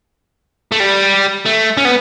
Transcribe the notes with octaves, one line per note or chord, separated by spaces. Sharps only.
A3
G3
A3
C#4
B3